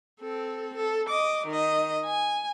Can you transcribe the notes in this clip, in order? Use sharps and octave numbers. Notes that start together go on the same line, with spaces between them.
C4 A4
A4
D#5 D6
D#3 D#5
G#5